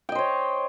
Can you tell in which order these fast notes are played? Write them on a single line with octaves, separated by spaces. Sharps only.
G5 D#5 C5 C#5